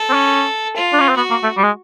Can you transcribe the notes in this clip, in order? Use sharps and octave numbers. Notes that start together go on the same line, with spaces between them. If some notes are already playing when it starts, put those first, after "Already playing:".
Already playing: A4
C4
C#4
F4
D4
C#4
C4
B3 F#4
A#3
A3
G3
G#3